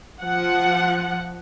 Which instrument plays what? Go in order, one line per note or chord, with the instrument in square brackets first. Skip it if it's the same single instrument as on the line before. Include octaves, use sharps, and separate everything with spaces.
[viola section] F3 F#5